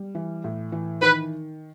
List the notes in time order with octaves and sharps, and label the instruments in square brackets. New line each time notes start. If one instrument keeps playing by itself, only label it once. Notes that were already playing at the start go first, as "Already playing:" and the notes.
Already playing: [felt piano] G3
E3
A2
E3
[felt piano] D#3 [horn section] B4